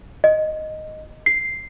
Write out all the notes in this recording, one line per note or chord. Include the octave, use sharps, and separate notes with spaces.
D#5
C7